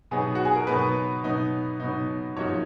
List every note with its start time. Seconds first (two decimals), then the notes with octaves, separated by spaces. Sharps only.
0.11 B2 F#3 B3 D#4 G#4
0.35 F#4
0.45 G#4
0.56 A#4
0.67 B2 F#3 B3 D#4 B4
1.24 B2 F#3 B3 D#4
1.80 B2 F#3 B3 D#4
2.37 F#2 F3 A#3 D#4 F#4 C#5